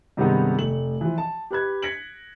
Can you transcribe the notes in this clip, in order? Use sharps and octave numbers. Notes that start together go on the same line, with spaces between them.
G2 C3 D#3 G#3 B3 D#4
F1 A3 F#7
E3 F3
A5
G4 B4 F#6 G#6
G#6 A#6 B6 C#7 D7 F#7